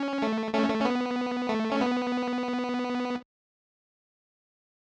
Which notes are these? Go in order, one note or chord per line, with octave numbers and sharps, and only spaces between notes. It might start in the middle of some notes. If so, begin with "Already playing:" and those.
Already playing: C#4
A3
A3 C#4
A3
C#4
B3
A3
C#4
B3